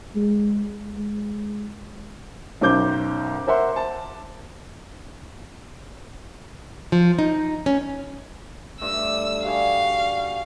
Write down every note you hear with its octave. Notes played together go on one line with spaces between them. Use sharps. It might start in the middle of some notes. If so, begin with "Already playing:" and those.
G#3
G#3
B1 F#2 C5 D6 G6
A#4 C5 E5 F#5 C6
A5
F3
D#4
C#4
G2 A3 E6
G3 F#4 G#4 F5